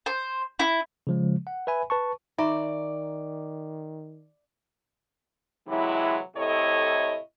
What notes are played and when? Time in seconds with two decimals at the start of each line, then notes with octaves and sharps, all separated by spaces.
0.06 C5
0.59 E4
1.07 C#3 F3 G#3
1.47 F#5
1.67 B4 E5 G#5 B5
1.90 B4 A5 C#6
2.38 D#3 D#4 D5 E5 A#5 C#6
5.68 C3 E3 F#3 G#3 E4
6.36 A2 C3 E4 A4 C#5 D#5